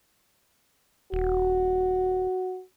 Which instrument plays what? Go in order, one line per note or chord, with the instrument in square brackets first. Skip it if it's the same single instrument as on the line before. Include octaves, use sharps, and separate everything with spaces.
[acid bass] D#1 [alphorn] F#4